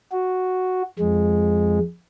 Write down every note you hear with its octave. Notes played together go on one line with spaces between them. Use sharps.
F#4
F2 G#3